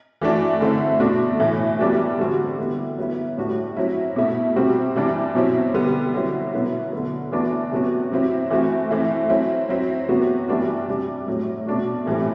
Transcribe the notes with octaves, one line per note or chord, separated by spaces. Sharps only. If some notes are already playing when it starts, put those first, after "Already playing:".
E3 A3 D4 F#4
D3 A3 C4 E4
B2 A3 D4 F#4
A2 E3 A3 E4
E3 G3 B3 D4 F#4
D3 G3 C4 F#4
D3 G3 B3 E4
F#3 B3 E4
A2 G3 D4 F#4
F#3 C4 E4
B2 A3 E4
C3 G3 C4 F#4
C3 E3 G3 D4
B2 F#3 C4 E4
D3 G3 B3
D3 F#3 C4 E4
B2 F#3 B3 E4
D3 F#3 B3
E3 B3 D4 F#4
C3 F#3 B3 F#4
C3 F#3 C4 E4
E3 A3 C4 F#4
E3 A3 C4 E4
F#3 C4 E4
F#3 C4 E4
C3 F#3 B3 F#4
E3 G3 B3 D4 F#4
C3 G3 D4
A2 F#3 A3
B2 A3 D4 F#4
A2 E3 G3 C4